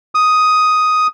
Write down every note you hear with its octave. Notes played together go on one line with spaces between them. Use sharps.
D#6